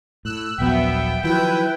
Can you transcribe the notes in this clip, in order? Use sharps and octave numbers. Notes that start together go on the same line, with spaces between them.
A2 E6 F#6
D#1 A#1 F#3 B3 E5 G5
D#3 F3 F#3 E4 B4 G5